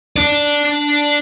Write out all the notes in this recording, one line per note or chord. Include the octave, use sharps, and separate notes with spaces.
D4 D5